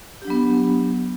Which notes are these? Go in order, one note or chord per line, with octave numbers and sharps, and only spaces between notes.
F#3 B3 D4 G4